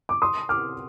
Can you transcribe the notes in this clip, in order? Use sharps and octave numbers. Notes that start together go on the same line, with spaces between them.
D6
C6 D#6
D6 F6